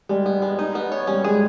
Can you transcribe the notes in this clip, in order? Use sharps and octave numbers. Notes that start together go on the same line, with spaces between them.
G3 G#3
B3
G#3
D#4
B3
C#5
G3 C#4
G#3 G#4